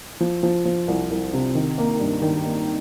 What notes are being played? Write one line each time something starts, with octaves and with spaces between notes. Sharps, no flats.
F3
F3
F3
C2
C2
C3
D#3
A#3
G2
D#3
A#3